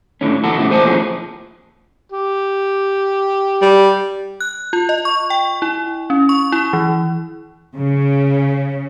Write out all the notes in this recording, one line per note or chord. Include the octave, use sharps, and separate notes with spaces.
A2 D3 C#4
E3 B3 F#4 A4
A2 C#3 E3 A3
G#4 C5 G#5 A5
B2 F3 A3 A#3 C#4 G#4
G4
G3
F#6
F4
D#5
C#6
G5
E4
C#4
C#6
E4
E3
C#3